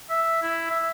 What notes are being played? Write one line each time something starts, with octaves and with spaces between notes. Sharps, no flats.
E5
E4
E5